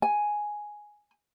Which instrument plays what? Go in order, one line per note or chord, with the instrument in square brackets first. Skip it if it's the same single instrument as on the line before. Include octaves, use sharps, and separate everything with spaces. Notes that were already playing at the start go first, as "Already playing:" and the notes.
[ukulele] G#5